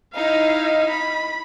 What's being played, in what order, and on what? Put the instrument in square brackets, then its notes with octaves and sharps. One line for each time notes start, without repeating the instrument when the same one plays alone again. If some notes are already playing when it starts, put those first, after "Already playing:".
[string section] D#4 [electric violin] E4 F5
[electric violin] B5